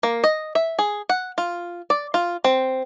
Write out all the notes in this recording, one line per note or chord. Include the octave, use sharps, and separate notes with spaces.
A#3
D#5
E5
G#4
F#5
F4
D5
F4
C4